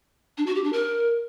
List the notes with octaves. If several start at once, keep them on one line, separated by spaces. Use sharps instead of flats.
D4
F#4
G4
D4
A#4